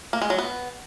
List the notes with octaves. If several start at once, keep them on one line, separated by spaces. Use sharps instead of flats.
A#3
G#3
F#3
B3